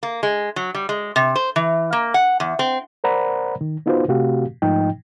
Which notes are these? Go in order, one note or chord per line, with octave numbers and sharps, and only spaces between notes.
A#3
G#3
F#3
G3
G#3
C3
C5
E3
A#3
F#5
E2
C4
A#4 C5 D5 F#5 A#5 B5
D#3
B3 D#4 F4 F#4 B4 C5
C3 A3 C4 F#4 G4 F5
G#2 F3 A3 D#4 D#5 G5